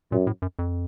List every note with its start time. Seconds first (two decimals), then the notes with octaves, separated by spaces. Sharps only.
0.12 F#2 A#2
0.27 A2
0.42 F#2
0.59 F2